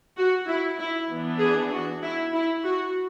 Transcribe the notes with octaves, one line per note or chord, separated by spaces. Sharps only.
F#4
E4
E4
E3 B3 D4
G#4
F#4
E4
E4
F#4